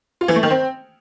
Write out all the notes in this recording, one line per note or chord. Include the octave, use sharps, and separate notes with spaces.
F4
E3
A3
D#3
C4